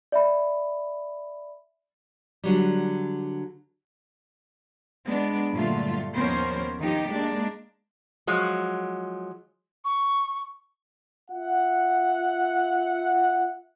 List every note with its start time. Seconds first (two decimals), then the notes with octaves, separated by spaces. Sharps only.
0.12 D5 E5 B5
2.44 D3 F#3 G3
5.05 G#3 B3 D4
5.52 G2 A#2 D3 F#3 A3 F4
6.14 D#2 F3 B3 C#4 A#4 C5
6.79 D#3 F3 D#4 G4
7.11 G#3 A#3 D4
8.27 F3 F#3 G#3
9.85 C#6
11.31 F4 E5 F#5